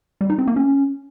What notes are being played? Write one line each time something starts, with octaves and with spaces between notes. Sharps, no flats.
G3
D#4
C4
A#3
C#4